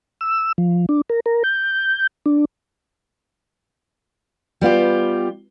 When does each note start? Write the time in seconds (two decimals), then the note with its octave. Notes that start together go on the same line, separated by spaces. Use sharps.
0.21 E6
0.58 F3
0.89 D4
1.09 A#4
1.26 A#4
1.44 G6
2.26 D4
4.61 G3 B3 F4 G4